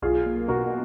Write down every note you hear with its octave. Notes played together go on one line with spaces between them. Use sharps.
B1 F4 G#4
A#3
B2 F#4 A#4